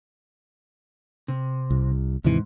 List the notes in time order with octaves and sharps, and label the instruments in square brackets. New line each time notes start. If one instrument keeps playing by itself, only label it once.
[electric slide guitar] C3
[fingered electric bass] C2
[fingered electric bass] D#2 C3 E3 [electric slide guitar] G#2